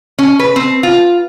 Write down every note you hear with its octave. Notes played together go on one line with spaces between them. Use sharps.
C#4
B4
C4
F4